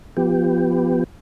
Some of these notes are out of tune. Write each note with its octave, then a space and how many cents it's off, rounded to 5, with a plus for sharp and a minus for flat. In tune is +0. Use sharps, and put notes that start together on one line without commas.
F3 +0 B3 +15 G4 +0